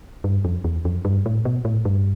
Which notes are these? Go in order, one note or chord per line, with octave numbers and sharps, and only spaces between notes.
G2
F2
E2
F2
G2
A2
B2
A2
G2